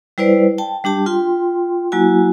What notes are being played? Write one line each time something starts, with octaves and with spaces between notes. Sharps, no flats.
G3 E4 B4 C5 D5
G5 A5
G3 D4 G4 A5
F4 G5 C6
F#3 A#3 E4 F#4 G#5